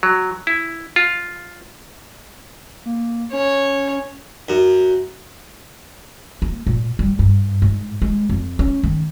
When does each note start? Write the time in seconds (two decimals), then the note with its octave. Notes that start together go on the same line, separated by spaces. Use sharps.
0.03 F#3
0.47 E4
0.96 F4
2.86 A#3
3.32 C#4 C#5
4.49 F#2
6.42 A#3
6.67 A#2
6.99 G3
7.19 G2
7.62 G#2
8.02 G#3
8.29 F2
8.59 C#4
8.83 D#3